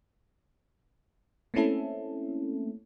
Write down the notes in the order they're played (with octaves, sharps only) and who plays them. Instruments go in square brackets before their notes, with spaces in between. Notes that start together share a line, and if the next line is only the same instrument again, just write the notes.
[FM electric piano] A3 A#3 C4 C#4 E4 A4